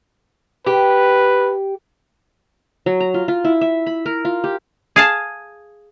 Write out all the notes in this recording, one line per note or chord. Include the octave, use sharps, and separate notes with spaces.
G4 B4
F#3
A#5
F4
F4
E4
E5
B5
A#4
F4
G4
G#4 F5 A5